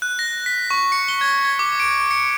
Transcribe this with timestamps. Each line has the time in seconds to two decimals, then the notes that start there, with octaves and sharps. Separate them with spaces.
0.02 F#6
0.19 A#6
0.46 B6
0.71 C#6
0.92 C#7
1.08 G7
1.21 G#6
1.45 G#6
1.59 D6
1.80 D7
2.11 C#7